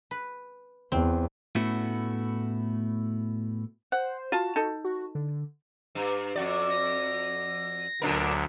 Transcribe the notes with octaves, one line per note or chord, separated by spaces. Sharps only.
B4
E2 C4
A2 A3 B3 C#4 E4 F#4
C5 F#5
F4 F#4 A5
D#4 A4
F#4
D3
G2
F2 F#4 D5
A#6
D2 A#2 F#3 D4 A#4